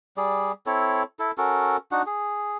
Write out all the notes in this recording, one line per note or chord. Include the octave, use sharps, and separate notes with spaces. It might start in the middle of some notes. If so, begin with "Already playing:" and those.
G3 G#4 D5
C4 E4 A4 C#5
E4 A4
C#4 F#4 A4 A#4
D4 D#4 F#4 F#5
G#4